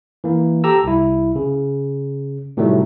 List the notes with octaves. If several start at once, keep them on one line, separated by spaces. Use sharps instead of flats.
E3 A#3
G4 A4 A#5 E6
C2 E4
C#3
A2 C3 D#3 F#3 G3 A3